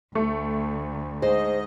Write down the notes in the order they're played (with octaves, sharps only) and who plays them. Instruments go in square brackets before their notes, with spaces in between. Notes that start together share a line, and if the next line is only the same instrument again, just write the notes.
[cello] D2 [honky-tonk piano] A3
[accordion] G#2 D#5 [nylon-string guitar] G#4 C5